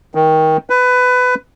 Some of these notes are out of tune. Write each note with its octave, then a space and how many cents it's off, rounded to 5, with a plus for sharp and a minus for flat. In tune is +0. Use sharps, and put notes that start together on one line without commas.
D#3 +20
B4 +20